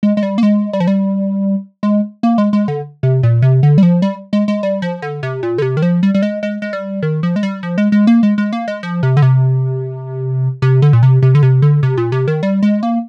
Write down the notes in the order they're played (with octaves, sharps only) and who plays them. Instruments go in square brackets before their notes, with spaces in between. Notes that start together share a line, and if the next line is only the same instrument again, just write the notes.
[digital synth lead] G#3
G#3
G3
A#3
G#3
G3
F3
G3
G#3
A#3
G#3
G#3
D3
C3
A#2
C3
D3
G3
F3
G3
G#3
G#3
G3
F3
D3
C3
A#2
D3
C3
D#3
F3
G3
G3
G#3
G#3
G#3
G3
D#3
F3
G#3
G3
F3
G#3
G#3
A#3
G#3
G#3
A#3
G#3
F3
C3
D3
C3
C3
D3
A#2
C3
C3
D3
C3
D3
C3
A#2
C3
D#3
G3
G#3
A#3